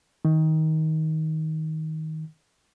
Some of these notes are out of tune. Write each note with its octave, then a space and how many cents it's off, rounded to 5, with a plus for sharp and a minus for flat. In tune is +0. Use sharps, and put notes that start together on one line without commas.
D#3 +20